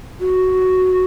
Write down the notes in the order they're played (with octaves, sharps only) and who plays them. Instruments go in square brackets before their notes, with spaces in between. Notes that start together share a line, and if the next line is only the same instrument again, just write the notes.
[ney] F#4